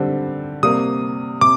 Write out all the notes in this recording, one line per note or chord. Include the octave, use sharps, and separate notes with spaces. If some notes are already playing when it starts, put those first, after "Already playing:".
Already playing: D3 G3 C4
C3 G3 A#3 D#6
C3 D6